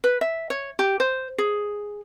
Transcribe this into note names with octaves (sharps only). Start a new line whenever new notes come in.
B4
E5
C#5
G4
C5
G#4